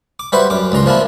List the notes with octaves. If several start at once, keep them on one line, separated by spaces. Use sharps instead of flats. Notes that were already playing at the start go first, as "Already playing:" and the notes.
D6
G3 F#4 B4 C5 E5
F#2 D6
C#2 G2 A#5 C6
F3 A#3 D4 E4